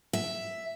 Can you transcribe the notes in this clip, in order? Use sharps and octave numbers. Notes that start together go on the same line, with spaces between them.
E5